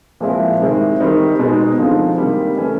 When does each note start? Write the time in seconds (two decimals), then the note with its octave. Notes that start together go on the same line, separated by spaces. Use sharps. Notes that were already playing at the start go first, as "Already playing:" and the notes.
0.20 A#2 F3 G#3 C4 E4
0.60 C3 D#3 G#3 C4 E4
1.00 D#3 G3 C4 D#4
1.39 B2 G#3 C4 D#4
1.78 D3 F3 G#3 C4 D#4
2.18 C3 D#3 G3 A#3
2.57 E3 A3 C#4